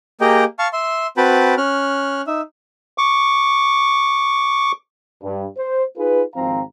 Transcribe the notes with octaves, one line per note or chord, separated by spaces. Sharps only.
A#3 G4 G#4 D#5 G5 A#5
F5 A5 C#6
E5 C6
C4 F#4 B4 G5 A5 B5
C#4 F6 F#6
D#4 E5
C#6 D6
G2
C5
D#4 F4 G#4 B4
G#1 D#2 F3 C4 F5 A#5